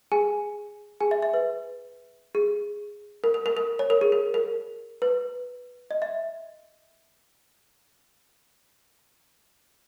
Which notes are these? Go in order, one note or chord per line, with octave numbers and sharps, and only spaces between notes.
G#4 G#5
G#4 G#5
E5
E5
B4
G#4
A#4
A#4
A#4
A#4
C#5
A#4
G#4
A#4
A#4
B4
D#5
E5